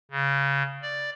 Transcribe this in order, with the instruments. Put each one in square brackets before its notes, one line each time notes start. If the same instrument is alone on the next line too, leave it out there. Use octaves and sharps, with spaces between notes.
[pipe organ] C#3
D5